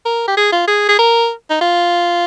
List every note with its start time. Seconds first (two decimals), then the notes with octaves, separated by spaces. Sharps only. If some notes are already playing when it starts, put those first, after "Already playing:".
0.05 A#4
0.28 G4
0.37 G#4
0.52 F4
0.67 G#4
0.89 G#4
0.99 A#4
1.50 D#4
1.61 F4